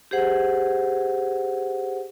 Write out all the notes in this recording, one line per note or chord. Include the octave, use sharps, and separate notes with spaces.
G4 G#4 C5 F#5